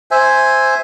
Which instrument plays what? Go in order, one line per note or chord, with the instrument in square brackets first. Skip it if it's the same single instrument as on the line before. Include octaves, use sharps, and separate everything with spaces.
[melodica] C5 E5 G#5